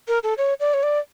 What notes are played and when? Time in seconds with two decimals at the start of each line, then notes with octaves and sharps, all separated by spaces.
0.08 A#4
0.23 A4
0.38 C#5
0.60 D5
0.74 C#5
0.83 D5